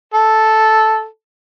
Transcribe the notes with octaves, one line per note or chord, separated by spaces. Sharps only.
A4